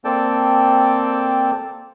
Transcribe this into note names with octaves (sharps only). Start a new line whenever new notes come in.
A#3 C4 A4 D5 G5 A5